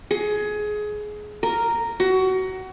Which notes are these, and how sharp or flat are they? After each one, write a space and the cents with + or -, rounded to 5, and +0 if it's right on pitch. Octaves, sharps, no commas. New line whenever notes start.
G#4 +20
A#4 -5
F#4 +25